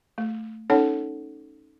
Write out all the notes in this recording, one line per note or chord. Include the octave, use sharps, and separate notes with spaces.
A3
C#4 D#4 A4 C#5 F#5